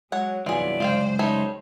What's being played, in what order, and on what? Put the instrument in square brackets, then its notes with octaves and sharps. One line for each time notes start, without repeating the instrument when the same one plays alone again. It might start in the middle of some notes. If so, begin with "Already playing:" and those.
[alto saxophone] F#3 [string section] G#3 [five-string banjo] C#5 F#5
[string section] C2 G2 [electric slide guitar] E3 F#3 B3 [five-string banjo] F4 G#4 [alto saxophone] D5
[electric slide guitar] F#2 C#3 G#3 [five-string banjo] F4 F5 G5 [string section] C5
[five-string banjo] G3 A3 C#5 [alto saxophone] D#4